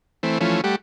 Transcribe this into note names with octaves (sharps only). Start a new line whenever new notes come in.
E3 A3 C4
E3 F3 A3 C#4
G3 A3 G4 F#5